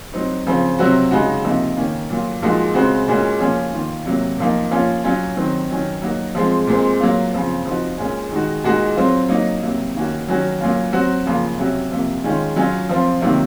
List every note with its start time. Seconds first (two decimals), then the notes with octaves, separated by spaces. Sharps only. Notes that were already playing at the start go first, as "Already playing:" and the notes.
0.13 F#3 C4 D#4
0.46 C#3 F3 C4
0.79 C3 F#3 C4 F#4
1.11 C#3 G#3 D#4 F#4
1.44 C3 F3 A#3 D#4
1.77 D#3 A#3 C#4
2.10 A#2 F#3 A#3 F4
2.42 A#2 F3 G#3 D#4 F#4
2.75 C#3 G#3 C4 F#4
3.08 A#2 G#3 C#4 F#4
3.40 F3 A#3 C#4 F4
3.73 D#3 A#3 F4
4.06 C3 F#3 A#3
4.39 A#2 F3 A#3 D#4
4.71 F3 A#3 C#4 F4
5.04 F#3 C#4 F4
5.37 D#3 F#3 C4
5.69 D#3 F#3 C#4
6.02 F#3 A#3 D#4 F#4
6.35 F3 G#3 C4
6.67 A#2 G#3 C4
7.00 F#3 A#3 F4
7.33 C#3 F3 C4
7.66 F3 C4 D#4 F#4
7.98 A#2 G#3 C#4
8.31 D#3 G#3 D#4 F#4
8.64 A#2 G#3 D#4 F#4
8.96 F#3 C4 F4
9.29 F#3 A#3 D#4
9.62 C3 F#3 A#3
9.95 D#3 A#3 C#4 F#4
10.28 D#3 F#3 C#4 F#4
10.61 F#3 A#3 C#4 F4
10.93 F#3 C4 F#4
11.26 C#3 F3 A#3 F4
11.58 C3 F#3 C#4 F#4
11.91 C3 F3 A#3
12.24 D#3 G#3 C#4 F4
12.56 F#3 C#4 F4
12.89 F3 C4 F4
13.22 C3 D#3 F#3 A#3 F4